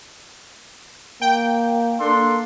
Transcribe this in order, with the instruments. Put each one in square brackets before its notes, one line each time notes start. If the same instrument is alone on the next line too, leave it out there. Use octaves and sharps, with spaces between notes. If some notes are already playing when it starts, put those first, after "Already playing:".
[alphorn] A#3 [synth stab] G5
[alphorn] A#3 [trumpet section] D4 A4 C6